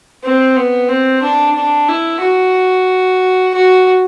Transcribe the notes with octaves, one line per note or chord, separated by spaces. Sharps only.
C4
B3
C4
D4
D4
E4
F#4
F#4